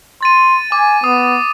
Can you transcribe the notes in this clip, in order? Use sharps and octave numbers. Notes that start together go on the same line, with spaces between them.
C6 A6 D#7
G#5 D6
B3 D#6